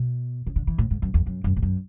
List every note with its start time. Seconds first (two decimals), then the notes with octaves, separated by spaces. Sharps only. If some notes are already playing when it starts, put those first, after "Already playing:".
Already playing: B2
0.47 C#3
0.56 D3
0.67 E3
0.78 A2
0.91 G#2
1.02 F#2
1.14 E2
1.27 F#2
1.44 F#2
1.56 G#2
1.62 F#2